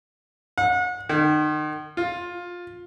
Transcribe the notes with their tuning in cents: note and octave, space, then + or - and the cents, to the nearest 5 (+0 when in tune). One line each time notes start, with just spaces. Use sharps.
F#5 -35
D#3 -35
F4 +15